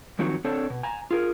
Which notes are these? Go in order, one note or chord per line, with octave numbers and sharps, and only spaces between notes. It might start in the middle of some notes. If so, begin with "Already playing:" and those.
D#3 F3 F#3 C4 D#4 F#4
C4 D4 A4 C#5
B2
G#5 A#5
F4 G#4 A#4